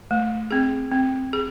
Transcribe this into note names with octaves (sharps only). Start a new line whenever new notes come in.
A3
C4 G#4
C4
G#4